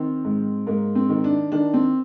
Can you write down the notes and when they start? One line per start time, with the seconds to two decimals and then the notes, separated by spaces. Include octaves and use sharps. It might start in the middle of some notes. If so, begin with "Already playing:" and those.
Already playing: D#3 C4
0.25 G#2
0.67 G#2 A#3
0.95 C4
1.09 D#3
1.24 D4
1.52 D#3 D4
1.74 C4